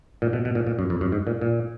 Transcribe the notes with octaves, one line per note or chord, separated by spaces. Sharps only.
A#2
B2
B2
A#2
A#2
F#2
F2
F#2
G#2
A#2
A#2